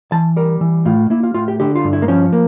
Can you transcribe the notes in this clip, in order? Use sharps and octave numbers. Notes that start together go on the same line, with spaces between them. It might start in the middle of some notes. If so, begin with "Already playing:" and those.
E3 A5
G3 A#4
E3
A2 F4
A#3 E4
F4
A2 F4
G4
D3 G4
F4
G2
E4
A#3
F3 C#4
A#3